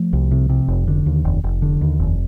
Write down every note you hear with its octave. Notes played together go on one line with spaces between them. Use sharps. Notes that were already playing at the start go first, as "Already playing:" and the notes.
Already playing: F3 A3
C2
C3
C3
F1
D3
D#2
F1
F1
D3
D#2
F1